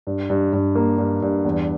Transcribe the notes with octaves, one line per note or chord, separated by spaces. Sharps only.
G2
G2
G2
A#3
G2
G2
E2